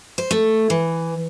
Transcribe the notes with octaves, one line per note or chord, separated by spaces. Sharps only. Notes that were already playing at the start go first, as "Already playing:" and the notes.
C5
A3
E3